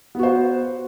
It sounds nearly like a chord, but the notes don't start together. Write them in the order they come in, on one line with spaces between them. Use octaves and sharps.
B3 F#4 C5